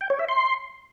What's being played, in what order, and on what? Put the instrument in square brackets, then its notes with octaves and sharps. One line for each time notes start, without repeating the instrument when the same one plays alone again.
[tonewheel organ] G5
C#5
E5
C6